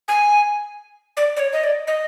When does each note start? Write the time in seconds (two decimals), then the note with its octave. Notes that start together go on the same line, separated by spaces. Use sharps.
0.08 G#5
1.17 D5
1.36 D5
1.39 C#5
1.53 D#5
1.64 D5
1.87 D#5